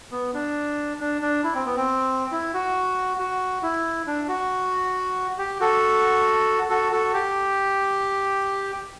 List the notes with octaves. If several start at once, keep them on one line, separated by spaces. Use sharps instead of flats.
B3
D4
D4
D4
E4
C4
B3
C4
E4
F#4
F#4
E4
D4
F#4
G4
F#4 A4
F#4 A4
F#4 A4
G4